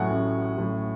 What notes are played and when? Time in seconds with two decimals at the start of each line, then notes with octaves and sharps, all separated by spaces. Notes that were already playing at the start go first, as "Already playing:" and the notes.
Already playing: A1 A2 F#3 F#5 G#5
0.10 A1
0.58 A2 F#3